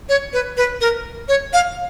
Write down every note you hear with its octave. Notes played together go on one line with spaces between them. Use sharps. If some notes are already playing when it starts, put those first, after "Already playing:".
C#5
B4
B4
A#4
C#5
F5